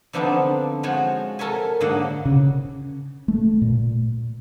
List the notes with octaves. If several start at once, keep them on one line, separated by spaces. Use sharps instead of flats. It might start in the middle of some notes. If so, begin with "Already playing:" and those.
D3 F3 B3 C4 D4 D#4
F3 G#3 F#4 C5 C#5
A4 A#4 C#5 E5 G#5
G#2 D3 F#3 A#3 D#5 F#5
C#3
A3
A#2